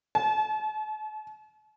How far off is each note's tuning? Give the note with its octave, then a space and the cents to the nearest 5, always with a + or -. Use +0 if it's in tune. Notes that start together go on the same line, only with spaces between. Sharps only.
A5 -40